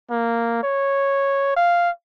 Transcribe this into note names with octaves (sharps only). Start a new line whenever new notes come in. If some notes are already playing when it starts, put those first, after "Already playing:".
A#3
C#5
F5